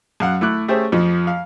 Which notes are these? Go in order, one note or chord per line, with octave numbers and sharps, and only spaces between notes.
F#2 F5 F#5
A3 E4 D6 F#6
A3 C#4 G4 G#4 C5 E5
F2 F3
F5